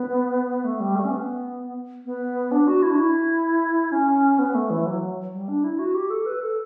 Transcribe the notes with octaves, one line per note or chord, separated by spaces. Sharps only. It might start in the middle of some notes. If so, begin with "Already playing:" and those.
Already playing: B3
A3
G3
A3
C#4
B3
B3
D4
F#4
E4
D4
E4
C#4
B3
A3
E3
F#3
G3
D4
E4
F#4
G4
A4
B4
A4